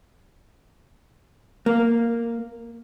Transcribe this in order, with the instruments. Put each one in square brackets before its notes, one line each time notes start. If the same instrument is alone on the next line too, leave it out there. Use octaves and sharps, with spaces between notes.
[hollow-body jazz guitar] A#3